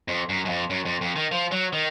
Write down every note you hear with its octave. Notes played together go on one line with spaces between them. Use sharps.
F2
F#2
F#2
F2
F#2
F2
F2
D#3
F3
F#3
D#3